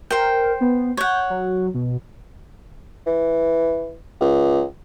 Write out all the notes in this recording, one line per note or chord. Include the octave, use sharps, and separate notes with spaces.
A#4 C5 G5
B3
C#5 F#5 G6
F#3
B2
E3
C#2